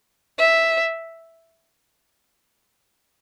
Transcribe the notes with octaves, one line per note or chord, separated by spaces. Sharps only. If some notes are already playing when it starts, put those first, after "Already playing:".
E5